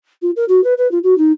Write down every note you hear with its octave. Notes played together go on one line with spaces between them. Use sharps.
F4
A#4
F#4
B4
B4
F4
F#4
D#4